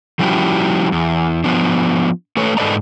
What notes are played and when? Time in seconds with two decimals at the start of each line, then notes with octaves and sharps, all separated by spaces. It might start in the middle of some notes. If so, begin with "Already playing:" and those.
0.19 F3 G3 C#4 E4 F#4 G4
0.92 E2
1.44 F3 B3 D4
2.37 A3 A4 B4 C#5
2.57 G#2 A4 B4 D5 D#5 A#5